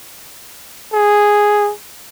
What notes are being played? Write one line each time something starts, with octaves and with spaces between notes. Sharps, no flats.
G#4